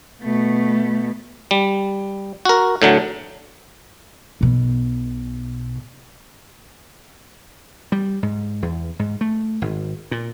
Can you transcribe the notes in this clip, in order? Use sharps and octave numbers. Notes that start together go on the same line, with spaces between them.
B2 A3
G3
F#4 A#4
A2 D3 F#3
B1 B2
G3
G#2
E2
G#2
A3
G#1
A#2